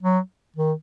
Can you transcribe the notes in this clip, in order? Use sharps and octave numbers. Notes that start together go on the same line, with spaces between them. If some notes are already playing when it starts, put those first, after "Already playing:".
F#3
D#3